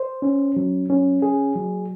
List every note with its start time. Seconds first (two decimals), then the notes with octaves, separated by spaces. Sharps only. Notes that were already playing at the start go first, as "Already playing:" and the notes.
Already playing: C5
0.22 C#4
0.56 F#3
0.90 C#4
1.22 G#4
1.56 F#3